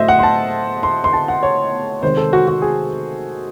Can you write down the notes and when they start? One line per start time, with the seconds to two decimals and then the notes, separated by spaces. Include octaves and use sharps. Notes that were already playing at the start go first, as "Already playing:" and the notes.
Already playing: A2 F#3 A3 C5 D#5 E5
0.08 F#5
0.19 C6
0.23 A5
0.83 C6
1.04 C6
1.13 A5
1.28 F#5
1.43 C#5
2.03 C3 D#3 G#3 C5
2.17 A4
2.33 F#4
2.48 F#4
2.62 G#4